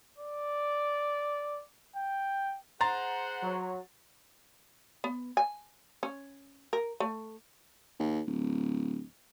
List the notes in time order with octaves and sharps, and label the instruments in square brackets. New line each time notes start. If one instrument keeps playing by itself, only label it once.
[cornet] D5
G5
[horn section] G#4 C5 F#5 [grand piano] A#5 C6 A6
[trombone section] F#3
[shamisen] B3
G#5
C#4
A#4
A3
[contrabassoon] D#2
D1